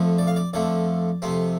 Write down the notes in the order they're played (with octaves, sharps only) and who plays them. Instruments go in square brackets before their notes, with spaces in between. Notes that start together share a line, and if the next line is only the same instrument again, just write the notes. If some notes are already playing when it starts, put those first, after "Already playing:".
Already playing: [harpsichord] F2 D3 F3 A3
D5
F5
D5
F2 D3 F3 A3 D5
F2 C3 A3 C4